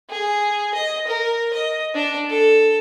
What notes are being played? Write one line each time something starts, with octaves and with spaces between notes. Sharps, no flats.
G#4
D#5
A#4
D#5
D4
A4